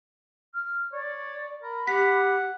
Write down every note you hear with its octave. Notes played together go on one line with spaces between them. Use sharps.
F6
C#5 D5
A#4 B5
G4 F#5 B6